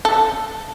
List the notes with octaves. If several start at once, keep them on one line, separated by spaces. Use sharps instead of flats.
A4